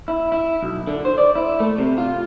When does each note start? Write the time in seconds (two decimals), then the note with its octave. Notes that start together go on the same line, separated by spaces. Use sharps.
0.08 E4
0.32 E4
0.62 B1
0.87 D3
1.05 C5
1.18 D5
1.35 E4
1.60 A3
1.78 C3
1.98 F4